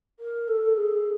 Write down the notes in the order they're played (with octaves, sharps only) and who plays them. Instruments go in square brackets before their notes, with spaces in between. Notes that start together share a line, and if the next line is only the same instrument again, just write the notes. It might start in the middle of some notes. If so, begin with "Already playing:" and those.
[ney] A#4
A4
G#4